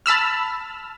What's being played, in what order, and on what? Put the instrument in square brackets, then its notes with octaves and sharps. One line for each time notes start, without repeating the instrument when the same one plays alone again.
[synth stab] A5 B5 E6 F6